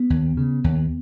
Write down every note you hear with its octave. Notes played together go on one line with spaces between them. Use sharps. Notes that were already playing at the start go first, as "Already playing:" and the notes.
Already playing: B3
D#2
C#3
D#2